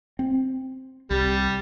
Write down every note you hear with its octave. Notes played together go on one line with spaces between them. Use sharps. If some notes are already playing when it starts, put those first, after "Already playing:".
C4
C2 G3